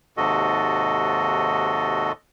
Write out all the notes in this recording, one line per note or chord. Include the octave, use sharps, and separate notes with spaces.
D#2 G#2 C3 F#4 A4 D#5